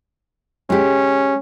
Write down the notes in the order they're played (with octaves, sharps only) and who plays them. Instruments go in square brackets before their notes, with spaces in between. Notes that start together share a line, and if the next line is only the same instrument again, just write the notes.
[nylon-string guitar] G#3 G4 [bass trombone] C#4